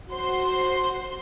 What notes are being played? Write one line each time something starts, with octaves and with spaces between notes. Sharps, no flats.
F#4 C5 C6